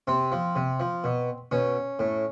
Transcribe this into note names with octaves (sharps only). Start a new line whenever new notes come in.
C3 C4
F3
C3
F3
B2
B2 C#4
A2